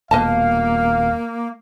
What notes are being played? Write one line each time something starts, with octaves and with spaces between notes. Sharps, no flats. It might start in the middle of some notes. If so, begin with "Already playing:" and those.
D#1 B2 A#3 B4 D#5 F5 A5